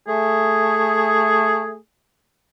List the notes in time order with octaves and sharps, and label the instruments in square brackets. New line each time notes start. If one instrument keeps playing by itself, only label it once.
[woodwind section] A3 G#4